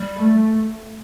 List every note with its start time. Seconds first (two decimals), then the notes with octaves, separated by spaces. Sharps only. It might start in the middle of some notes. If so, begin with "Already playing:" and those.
Already playing: G3
0.17 A3